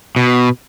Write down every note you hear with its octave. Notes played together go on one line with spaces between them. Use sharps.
B2